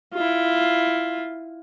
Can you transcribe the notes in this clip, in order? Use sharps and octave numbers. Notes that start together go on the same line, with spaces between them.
E4 F4